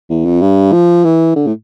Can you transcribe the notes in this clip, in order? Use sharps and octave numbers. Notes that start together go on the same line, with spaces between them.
E2
F2
G2
F3
E3
D3
A2